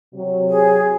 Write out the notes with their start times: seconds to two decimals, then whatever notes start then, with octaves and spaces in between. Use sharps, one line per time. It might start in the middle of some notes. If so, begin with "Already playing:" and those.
0.14 C3 F#3
0.49 G#4